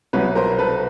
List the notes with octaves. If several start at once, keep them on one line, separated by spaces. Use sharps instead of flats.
C2 B2 F#3 B4 C#5
A#4 C5
A4 B4